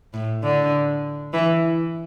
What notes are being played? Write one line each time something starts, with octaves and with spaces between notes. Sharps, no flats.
A2
D3
E3